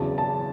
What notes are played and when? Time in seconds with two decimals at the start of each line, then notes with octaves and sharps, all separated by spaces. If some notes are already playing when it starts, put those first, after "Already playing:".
Already playing: E2 C#3 F#3 A5
0.18 A5